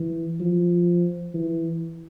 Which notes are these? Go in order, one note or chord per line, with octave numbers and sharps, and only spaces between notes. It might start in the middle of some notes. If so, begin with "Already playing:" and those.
Already playing: E3
F3
E3